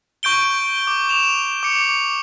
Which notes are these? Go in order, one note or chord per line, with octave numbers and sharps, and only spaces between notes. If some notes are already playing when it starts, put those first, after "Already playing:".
C#6 G6 D7 G7
D6
E7 F7
D6 C#7